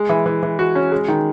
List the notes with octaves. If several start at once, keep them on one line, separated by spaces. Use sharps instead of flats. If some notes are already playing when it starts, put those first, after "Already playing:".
Already playing: G#3
E3
E3
E3
F#4
C#4
G#3
D#3